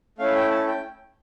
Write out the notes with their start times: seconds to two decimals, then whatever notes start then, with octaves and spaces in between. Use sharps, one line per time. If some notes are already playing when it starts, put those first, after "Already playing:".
0.18 A3 C#4 E4 F5
0.35 G5
0.51 A5
0.67 G5